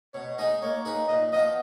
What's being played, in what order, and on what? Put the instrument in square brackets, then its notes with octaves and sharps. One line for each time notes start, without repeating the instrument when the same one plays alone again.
[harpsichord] B2 [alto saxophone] C#5
[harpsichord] G#3 D#4 G#4 [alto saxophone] D#5
[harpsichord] A#3 [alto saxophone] C#5
[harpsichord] D#4 G#4 B4
[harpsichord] A#2 [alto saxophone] D#5
[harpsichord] F3 B3 F4 [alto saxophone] D#5